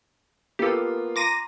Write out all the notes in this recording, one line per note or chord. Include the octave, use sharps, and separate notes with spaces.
A#3 B3 F4 G4 A4
A#5 C6 D6 A#6 D#7